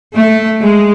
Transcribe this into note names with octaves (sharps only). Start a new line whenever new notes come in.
A3
G#3